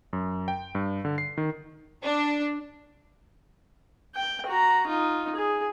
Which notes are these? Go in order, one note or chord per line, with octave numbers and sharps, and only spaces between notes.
F#2
G5
G2
D3
C7
D#3
D4
G5
F#4 A#5
D#4 F4
G#4